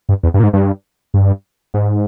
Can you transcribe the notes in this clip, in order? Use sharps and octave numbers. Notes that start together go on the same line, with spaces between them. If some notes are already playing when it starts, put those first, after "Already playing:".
G2
E2
G2
A#2
G#2
G2
G2
G#2